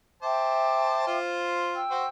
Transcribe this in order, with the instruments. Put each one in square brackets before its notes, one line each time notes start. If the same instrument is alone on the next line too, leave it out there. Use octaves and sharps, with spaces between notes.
[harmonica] C5 A5 [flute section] E5 G5 D6
[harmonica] F4 C5
[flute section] G5 E6
[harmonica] F#4 C5